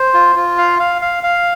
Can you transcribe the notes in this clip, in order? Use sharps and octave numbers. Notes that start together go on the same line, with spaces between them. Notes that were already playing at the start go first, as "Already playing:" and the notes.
Already playing: C5
F4
F4
F5
F5
F5
F5